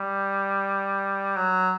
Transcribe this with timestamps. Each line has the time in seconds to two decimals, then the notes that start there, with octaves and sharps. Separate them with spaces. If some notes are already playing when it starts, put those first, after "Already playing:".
Already playing: G3
1.37 F#3